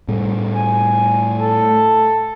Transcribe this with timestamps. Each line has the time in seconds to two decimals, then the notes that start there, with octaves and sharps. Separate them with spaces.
0.08 A2 G3 A3
0.56 G#5
1.39 A4